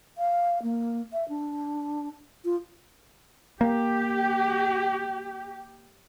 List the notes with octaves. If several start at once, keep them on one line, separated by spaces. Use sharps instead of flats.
F5
A#3
E5
D4
F4
A#3 G4